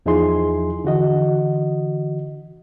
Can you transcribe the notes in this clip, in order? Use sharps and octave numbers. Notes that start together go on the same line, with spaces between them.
E2 F3 D#4 E4 G#4 C6
D3 E3 F#4 D#5